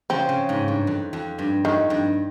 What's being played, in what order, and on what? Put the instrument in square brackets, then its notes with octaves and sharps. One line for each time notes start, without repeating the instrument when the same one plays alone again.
[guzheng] C#3 F3 [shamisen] C4
[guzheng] C#3
G#2
G2
F2
F2
G2
[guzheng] F2 [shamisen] D#3
[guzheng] G2